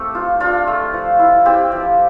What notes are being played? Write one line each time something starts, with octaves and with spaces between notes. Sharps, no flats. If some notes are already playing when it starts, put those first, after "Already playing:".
Already playing: A3 C4 G4 A4
F4
D4 F4
A3
F3
E4
C4 G4
F3